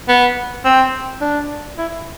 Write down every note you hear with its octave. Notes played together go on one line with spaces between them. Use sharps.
B3
C4
D4
E4